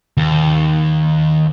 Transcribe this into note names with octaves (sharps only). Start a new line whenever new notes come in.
D#2